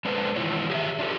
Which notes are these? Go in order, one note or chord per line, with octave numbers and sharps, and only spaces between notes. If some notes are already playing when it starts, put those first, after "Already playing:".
G#3 B3 D4 A4 B4 C5
D#3 E3 G#3 E4 F4 C#5
G4 G#4 D#5 E5
D4 F4 G4 A4